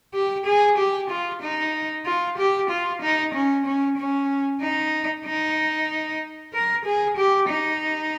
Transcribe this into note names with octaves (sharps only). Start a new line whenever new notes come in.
G4
G#4
G4
F4
D#4
F4
G4
F4
D#4
C#4
C#4
C#4
D#4
D#4
A#4
G#4
G4
D#4